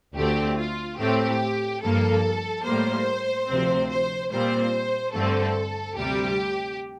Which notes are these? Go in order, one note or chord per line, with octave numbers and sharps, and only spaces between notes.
D2 D3 A3 C4 G4
F4
A2 A3 C4 G4
G2 F3 A#3 A4
A2 G3 A#3 C5
D2 C3 F3 C4
C5
A#2 G3 C4 C5
G2 D3 A3 C4 A4
D2 C3 G3 G4